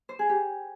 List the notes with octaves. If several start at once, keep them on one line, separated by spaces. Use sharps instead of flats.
C5
G#4
G4